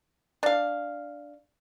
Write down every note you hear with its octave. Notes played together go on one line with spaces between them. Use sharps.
D4 F5